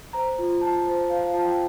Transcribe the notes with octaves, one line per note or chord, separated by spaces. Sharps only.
C5 A#5
F4
F4 A5
C5
C5 F5
F5
F4 A5
G5